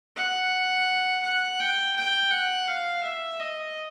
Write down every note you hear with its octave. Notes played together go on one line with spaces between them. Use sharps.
F#5
F#5
G5
G5
F#5
F5
E5
D#5